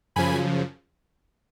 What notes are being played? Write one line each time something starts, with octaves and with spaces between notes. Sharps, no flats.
F#2 C#3 F3 G#5 B5